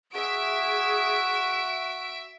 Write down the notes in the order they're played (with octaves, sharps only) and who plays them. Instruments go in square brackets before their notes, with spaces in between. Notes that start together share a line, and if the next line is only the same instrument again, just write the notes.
[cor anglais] F#4 [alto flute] G#4 [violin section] E5 D7